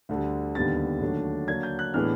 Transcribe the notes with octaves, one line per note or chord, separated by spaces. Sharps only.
D2 D3 G3
D#2 D3 G3 B3 A6
D#2 D3 F#3 A3 D4
D3 F#3 A#3 D4 G#6
G6
F#6
A2 E3 G#3 B3 D4 F6